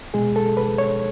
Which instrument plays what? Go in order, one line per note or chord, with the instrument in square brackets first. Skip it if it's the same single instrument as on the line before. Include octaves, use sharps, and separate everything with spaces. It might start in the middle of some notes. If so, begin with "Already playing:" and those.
[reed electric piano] B2 G#3 G#4
A4
B4
C#5